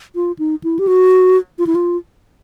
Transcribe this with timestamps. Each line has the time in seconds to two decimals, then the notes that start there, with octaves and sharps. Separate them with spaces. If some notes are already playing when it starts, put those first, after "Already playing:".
0.15 F4
0.39 D#4
0.64 E4
0.79 G4
0.87 F#4
1.59 F4
1.67 E4
1.75 F4